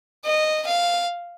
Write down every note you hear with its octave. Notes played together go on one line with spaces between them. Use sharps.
D#5
F5